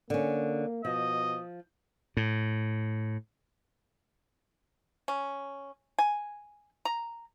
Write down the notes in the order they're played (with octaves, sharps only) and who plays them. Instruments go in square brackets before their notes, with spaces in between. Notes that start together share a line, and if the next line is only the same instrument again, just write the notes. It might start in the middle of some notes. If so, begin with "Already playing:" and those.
[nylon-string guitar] D3 C#4 [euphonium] A#3
[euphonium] B2 [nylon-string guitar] F3 [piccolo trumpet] D#5
[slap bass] A2
[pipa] C#4
G#5
A#5